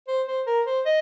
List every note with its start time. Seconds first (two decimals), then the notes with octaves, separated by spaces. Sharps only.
0.08 C5
0.27 C5
0.47 A#4
0.66 C5
0.86 D#5